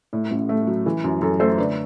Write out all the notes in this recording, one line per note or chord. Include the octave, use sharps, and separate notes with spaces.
A2
A1
A3
F#3
E3
F#2
F#2 A4
A3 A4 C5
D3 B4 D5